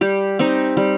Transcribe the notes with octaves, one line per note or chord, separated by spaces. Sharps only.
G3 G4
C4 D#4 G4
G3